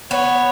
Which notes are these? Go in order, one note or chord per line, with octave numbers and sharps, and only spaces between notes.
B3 C#5